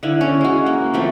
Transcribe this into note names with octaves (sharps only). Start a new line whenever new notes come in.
D3 E4 F5
C#4 C#5
G#3 F#4
A#3
F3 A3 C4